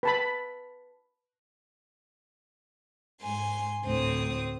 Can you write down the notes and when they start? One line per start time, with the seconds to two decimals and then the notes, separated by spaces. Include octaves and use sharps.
0.03 B4 A5 B5
3.22 G#2 G#5 C6
3.84 D2 A2 C4 D#6